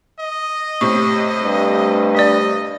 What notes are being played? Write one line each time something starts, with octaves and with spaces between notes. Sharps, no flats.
D#5
A2 C3 C#6
G2
D4 D5 D#5